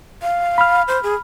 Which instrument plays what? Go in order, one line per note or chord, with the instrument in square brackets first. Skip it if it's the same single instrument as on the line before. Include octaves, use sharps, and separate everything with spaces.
[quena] F5
[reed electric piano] B5 F6
[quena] C5
G#4